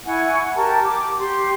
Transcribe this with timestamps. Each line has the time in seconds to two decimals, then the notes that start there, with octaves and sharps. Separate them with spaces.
0.05 E4 F#5 G#5 C#6
0.55 G4 A#4 A5
0.84 D6
1.18 G4 C6